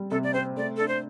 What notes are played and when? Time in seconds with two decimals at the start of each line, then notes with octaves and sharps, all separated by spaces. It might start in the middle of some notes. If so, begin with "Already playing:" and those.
Already playing: G3 C4
0.11 C3 A4
0.23 D5
0.34 C4 C5
0.57 A3 D5
0.77 D4 A4
0.88 C5